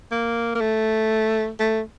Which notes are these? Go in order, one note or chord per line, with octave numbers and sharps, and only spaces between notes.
A#3
A#3
A3
A3